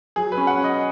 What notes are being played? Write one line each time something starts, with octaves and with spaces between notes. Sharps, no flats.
F#3 G#4
B4
C#4
F#5
C#4
D#5